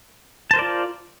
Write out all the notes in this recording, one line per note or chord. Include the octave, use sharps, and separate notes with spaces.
F4 A#4 C5 D5 A5